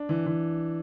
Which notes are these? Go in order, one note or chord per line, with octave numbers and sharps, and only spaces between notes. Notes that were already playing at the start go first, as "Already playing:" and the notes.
Already playing: D4
E3
E3